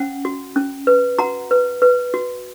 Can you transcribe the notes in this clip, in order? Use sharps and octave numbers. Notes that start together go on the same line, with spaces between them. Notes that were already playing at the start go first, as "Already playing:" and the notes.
Already playing: C#4 F#5
F#4
C#4
B4
F#4 F#5 A#5
B4
B4
F#4